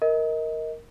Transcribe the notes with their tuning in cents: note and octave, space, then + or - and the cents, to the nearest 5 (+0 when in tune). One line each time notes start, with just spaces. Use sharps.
A#4 +0 D#5 +25